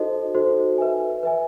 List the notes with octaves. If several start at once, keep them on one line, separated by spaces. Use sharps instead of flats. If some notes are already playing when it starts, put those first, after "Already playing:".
Already playing: D#4 F#4 A4 C5 D#5
D#4 F#4 A4 C5 D#5
B4 E5 G#5
B4 E5 G#5